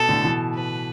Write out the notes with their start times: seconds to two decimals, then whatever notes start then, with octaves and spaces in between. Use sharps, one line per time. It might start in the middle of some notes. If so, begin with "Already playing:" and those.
Already playing: B2 A4
0.09 A2 D3
0.24 B2 E3
0.55 B4